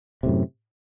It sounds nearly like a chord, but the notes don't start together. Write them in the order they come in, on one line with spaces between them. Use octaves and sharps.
C3 A2 F#2